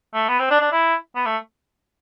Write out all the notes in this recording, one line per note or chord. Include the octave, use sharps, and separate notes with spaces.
A3
B3
C4
D4
D4
E4
B3
A3